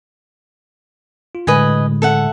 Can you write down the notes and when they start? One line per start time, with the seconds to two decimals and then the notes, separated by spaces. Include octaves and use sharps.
1.35 F4
1.47 A2 D3 G#3 B4 D#5 G#5
2.02 A4 E5 F#5